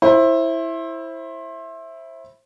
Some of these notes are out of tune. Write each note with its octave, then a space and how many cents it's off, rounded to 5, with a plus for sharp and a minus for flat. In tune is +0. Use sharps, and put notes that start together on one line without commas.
E4 +0 C5 +30